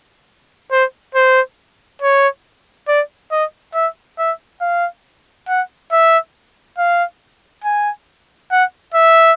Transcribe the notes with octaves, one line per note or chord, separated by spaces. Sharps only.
C5
C5
C#5
D5
D#5
E5
E5
F5
F#5
E5
F5
G#5
F#5
E5